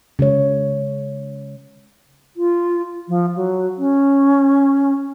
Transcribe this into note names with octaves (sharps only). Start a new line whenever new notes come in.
C#3 G#3 C#5
F4
F3
F#3
C#4